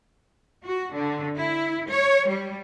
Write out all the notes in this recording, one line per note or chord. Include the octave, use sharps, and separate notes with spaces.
F#4
D3
E4
C#5
G3